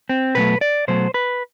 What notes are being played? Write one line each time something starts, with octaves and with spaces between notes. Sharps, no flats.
C4
B2 F#3 A3 B4
D5
B2 F#3 A3 C5
B4